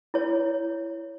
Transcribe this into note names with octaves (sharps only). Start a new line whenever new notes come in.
E4 C#5